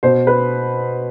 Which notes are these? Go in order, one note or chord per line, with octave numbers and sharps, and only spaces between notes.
B2 C5
B4